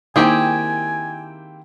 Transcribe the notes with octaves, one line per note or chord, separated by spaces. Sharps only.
D#3 A#3 C4 E4 G4 G#4 G5 G#5